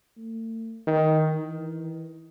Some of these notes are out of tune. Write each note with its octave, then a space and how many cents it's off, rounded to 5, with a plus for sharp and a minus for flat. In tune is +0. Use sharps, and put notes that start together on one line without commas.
A3 +40
D#3 +10
E3 -15